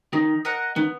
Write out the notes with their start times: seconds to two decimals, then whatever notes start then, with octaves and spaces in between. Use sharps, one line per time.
0.13 D#3 D#4
0.45 A#4 D#5 F#5
0.76 D#3 B3